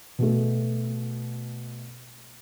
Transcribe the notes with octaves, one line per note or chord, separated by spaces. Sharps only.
B2 A3